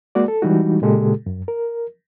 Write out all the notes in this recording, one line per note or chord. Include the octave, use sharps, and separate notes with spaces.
G#3 A#3 F#4 D5
A4
E3 G3 G#3 D#4 F#4
A#2 C#3 G#3 G4 A4
F#2
A#4